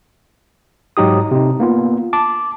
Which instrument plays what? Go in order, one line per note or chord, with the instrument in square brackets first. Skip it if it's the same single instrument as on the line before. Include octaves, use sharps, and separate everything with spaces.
[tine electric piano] G#2 F#3 D#4 G4 D#6
C3 D#4
A#3 B3 F4
A5 D6